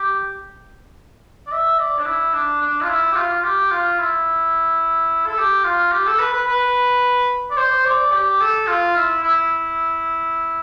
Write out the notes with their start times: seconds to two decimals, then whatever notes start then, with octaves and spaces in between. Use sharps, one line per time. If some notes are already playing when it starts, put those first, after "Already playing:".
Already playing: G4
1.47 D5
1.52 E5
1.79 D5
1.99 D4
2.06 E4
2.34 D4
2.62 D4
2.82 F4
2.89 E4
3.12 G4
3.16 F4
3.40 F4
3.44 G4
3.71 F4
3.99 E4
5.26 A4
5.38 G4
5.64 F4
5.92 G4
6.06 A4
6.19 B4
6.33 B4
6.47 B4
7.51 D5
7.57 C5
7.85 D5
8.12 G4
8.40 A4
8.67 F4
8.96 E4
9.23 E4